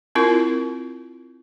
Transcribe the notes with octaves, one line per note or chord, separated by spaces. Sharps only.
C4 E4 F4 A#4